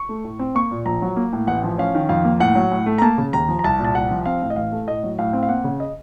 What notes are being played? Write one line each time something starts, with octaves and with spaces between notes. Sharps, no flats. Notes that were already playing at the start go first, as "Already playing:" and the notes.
Already playing: C#6
A3
A2
C4
A#3 C#6
A#2
A#1 A#5
F#3
A#3
A2
A1 F#5
F3
C#4 F5
D#3
F2 F5
A#3
A2 F#5
F#3
A2
A3
A#5
A#3 A5
C#3
D#2 A#5
F3
A#5
C2 A5
A#2
A5
C2 F#5
F3
C4 F5
A2
D#5
A1 F5
A3
A2 D#5
F#3
A2 F5
C4
F5
A#3 F#5
C#3
D#5